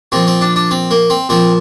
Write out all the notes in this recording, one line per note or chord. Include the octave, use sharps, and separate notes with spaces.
A#2 F3 C4
C4
D4
D4
C4
A#3
C4
A#2 F3 C4